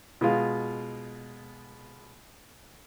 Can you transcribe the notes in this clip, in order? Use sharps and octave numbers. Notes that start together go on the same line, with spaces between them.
B2 G#3 F4